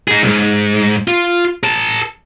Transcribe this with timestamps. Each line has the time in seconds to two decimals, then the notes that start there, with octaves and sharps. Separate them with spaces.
0.08 D#4 G#4
0.23 C2 G#2
1.08 F4
1.63 A#4 A5